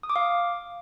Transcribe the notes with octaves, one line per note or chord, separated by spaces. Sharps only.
D#6
D6
F5